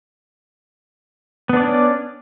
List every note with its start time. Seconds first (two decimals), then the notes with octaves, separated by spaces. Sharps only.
1.49 B3
1.53 D4
1.57 D5
1.60 C#4